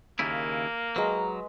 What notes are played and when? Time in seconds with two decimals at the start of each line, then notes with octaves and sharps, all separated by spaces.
0.19 D#2 C#3 A#3 E4
0.96 F#3 G#3 B4 A#5